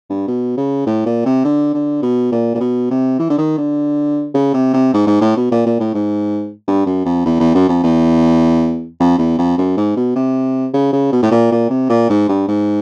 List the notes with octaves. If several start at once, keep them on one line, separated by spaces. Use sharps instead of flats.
G2
B2
C#3
A2
A#2
C3
D3
D3
B2
A#2
A#2
B2
C3
E3
D3
D#3
D3
C#3
C3
C3
G#2
G#2
A2
B2
A#2
A#2
A2
G#2
G2
F#2
F2
E2
E2
F#2
F2
E2
F2
E2
F2
F#2
G#2
B2
C3
C#3
C#3
B2
A2
A#2
A#2
C3
A#2
G#2
G2
G#2